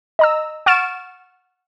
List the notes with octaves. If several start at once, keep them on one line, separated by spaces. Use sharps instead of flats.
D#5 A#5 E6
F#5 C#6 F6 A6 D7 E7